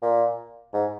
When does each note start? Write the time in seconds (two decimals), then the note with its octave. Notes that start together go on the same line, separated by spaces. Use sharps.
0.02 A#2
0.74 G#2